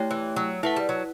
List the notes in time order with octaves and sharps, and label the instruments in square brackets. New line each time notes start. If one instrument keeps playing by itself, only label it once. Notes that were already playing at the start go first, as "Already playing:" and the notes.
Already playing: [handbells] A3 E4 G4 C#5 G5
[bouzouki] E3
F#3
[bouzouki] A3 [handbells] E4 B4 F#5
[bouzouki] G3
F#3